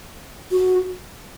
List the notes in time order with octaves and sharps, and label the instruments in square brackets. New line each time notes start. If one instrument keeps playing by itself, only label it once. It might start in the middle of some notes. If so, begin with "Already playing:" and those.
[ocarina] F#4